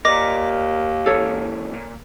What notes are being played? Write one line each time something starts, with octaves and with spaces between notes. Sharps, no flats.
D#2 A#4 D5 D#5 A#5 D6 A#6
C#3 E3 A#3 A4 C#5
A#2